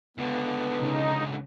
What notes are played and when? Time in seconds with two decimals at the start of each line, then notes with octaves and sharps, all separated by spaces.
0.18 C#2 D3 B3
0.79 C#3 D#4